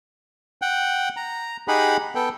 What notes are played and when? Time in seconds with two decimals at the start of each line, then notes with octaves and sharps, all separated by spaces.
0.62 F#5 G5
1.17 A#5
1.68 D#4 G4 G#4 F#5 B5
2.15 B3 A4 G5